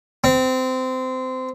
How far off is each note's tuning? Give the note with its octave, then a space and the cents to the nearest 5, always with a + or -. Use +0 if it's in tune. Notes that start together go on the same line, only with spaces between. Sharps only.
C4 -20